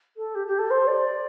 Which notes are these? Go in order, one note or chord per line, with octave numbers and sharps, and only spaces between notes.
A4
G4
G4
A4
C5
D5